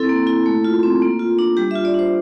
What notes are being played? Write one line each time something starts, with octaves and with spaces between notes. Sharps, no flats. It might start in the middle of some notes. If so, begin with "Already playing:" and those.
Already playing: C4 E4 A4
A#3
E4
A3
F4
C4
A#3
F4
D4
G3 G4
F4 E5
D5
D4 C5